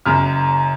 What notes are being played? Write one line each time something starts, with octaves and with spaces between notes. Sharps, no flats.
F#1 F#2 C#3 F6